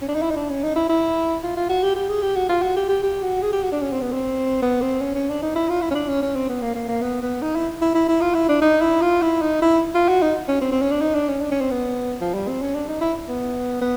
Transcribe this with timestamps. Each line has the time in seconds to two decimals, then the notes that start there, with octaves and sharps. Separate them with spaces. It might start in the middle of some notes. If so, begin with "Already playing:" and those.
0.02 C#4
0.09 D4
0.15 D#4
0.23 E4
0.31 D#4
0.36 D4
0.50 C#4
0.64 D#4
0.76 E4
0.90 E4
1.44 F4
1.57 F4
1.69 F#4
1.83 G4
1.96 G4
2.09 G#4
2.23 G4
2.36 F#4
2.49 F4
2.62 F#4
2.77 G4
2.89 G4
3.03 G4
3.23 F#4
3.43 G#4
3.53 G4
3.63 F#4
3.72 D4
3.82 C#4
3.93 C4
4.01 B3
4.12 C4
4.63 B3
4.82 C4
5.02 C#4
5.16 C#4
5.29 D4
5.43 D#4
5.56 E4
5.70 F4
5.82 E4
5.91 C#4
5.95 D4
6.08 C#4
6.23 C#4
6.36 C4
6.49 B3
6.62 A#3
6.75 A#3
6.89 A#3
7.02 B3
7.23 B3
7.42 D#4
7.56 E4
7.82 E4
7.95 E4
8.09 E4
8.22 F4
8.35 E4
8.49 D4
8.62 D#4
8.82 E4
9.02 F4
9.22 E4
9.42 D#4
9.62 E4
9.95 F4
10.09 F#4
10.22 D#4
10.48 C#4
10.61 C4
10.72 C4
10.82 C#4
10.92 D4
11.01 D#4
11.15 D4
11.29 C#4
11.41 D4
11.52 C#4
11.61 C4
11.71 B3
12.21 F3
12.34 G3
12.48 C4
12.62 C#4
12.75 D4
12.89 D#4
13.01 E4
13.29 B3
13.82 B3